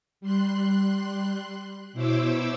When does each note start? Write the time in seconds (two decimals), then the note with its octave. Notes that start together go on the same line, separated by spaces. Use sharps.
0.21 G3 C6 F#6
1.93 B2 E4 C5 C#5 D6 E6